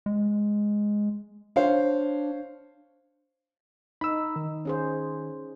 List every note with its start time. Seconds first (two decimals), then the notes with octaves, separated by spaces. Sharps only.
0.06 G#3
1.56 D4 C5 C#5 F5
4.01 D#4 B5 E6
4.36 D#3
4.65 C#4 G#4 C5